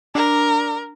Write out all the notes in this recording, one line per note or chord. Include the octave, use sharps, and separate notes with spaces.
D4 A#4